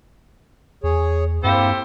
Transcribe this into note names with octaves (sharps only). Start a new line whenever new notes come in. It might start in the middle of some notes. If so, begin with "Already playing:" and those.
E2 G#4 C#5
G2 A#3 C4 E4 G4 A4 C5